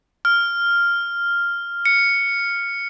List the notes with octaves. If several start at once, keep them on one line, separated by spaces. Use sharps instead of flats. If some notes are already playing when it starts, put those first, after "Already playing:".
F6
C#7